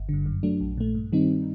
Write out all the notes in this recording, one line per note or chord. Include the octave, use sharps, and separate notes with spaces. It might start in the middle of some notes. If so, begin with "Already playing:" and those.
Already playing: G1
G2 D3
F#2
F#3 A3 D4
A#1
A#2 A3
G2
D#3 G3 C4 D#4